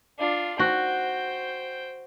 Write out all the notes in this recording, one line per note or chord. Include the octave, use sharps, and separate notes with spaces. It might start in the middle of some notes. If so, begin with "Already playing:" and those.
D4 F4
F#4 C5 G5